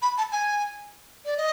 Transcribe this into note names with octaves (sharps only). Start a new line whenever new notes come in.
B5
A5
G#5
D5
D#5